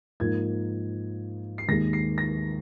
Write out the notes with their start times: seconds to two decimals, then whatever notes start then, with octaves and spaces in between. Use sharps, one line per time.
0.20 G#2 F3 A#3 G#6
1.58 C7
1.69 D#2 D#3 G#3 A#6
1.93 C7
2.18 A#6